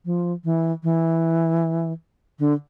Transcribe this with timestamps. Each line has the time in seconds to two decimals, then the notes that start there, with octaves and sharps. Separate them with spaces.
0.05 F3
0.44 E3
0.83 E3
2.39 D3